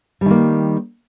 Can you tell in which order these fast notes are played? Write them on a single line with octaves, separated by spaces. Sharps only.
G3 D#3 A#3